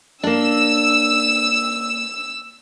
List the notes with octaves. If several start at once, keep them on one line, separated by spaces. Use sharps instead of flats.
A#3 D4 E6